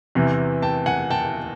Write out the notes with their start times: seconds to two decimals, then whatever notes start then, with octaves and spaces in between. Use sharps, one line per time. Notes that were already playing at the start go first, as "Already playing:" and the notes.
0.15 E2 C3 E3
0.62 G5 A5
0.86 F#5 G#5
1.10 G5 A5